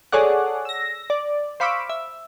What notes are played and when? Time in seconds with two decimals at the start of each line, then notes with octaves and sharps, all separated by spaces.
0.12 G#4 A4 C#5 D5 F#5
0.65 E6 A#6
1.10 D5
1.60 C5 F5 B5 C#6 D6 E6
1.90 E5